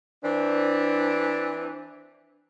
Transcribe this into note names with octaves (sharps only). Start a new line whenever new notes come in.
E3 C4 D4